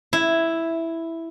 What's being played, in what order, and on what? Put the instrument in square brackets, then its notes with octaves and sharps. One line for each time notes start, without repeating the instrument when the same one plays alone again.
[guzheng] E4